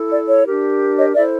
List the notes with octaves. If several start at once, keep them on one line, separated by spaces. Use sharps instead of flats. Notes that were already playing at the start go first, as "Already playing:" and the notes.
Already playing: E4 A4
D5
C#5
D4 G4 A#4
C#5 D#5
E4 A4 C5 D5 E5